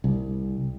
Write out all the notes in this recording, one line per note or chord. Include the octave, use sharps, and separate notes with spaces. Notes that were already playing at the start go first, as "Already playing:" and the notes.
C2